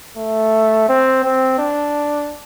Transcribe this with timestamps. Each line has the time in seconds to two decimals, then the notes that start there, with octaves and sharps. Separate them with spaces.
0.17 A3
0.88 C4
1.23 C4
1.58 D4